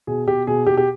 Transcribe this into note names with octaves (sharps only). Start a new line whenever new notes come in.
B2 G#4
B2 G4
B2 G#4
B2 G4
G4